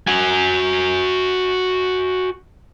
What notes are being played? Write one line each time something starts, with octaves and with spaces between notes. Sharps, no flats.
F#4 G#5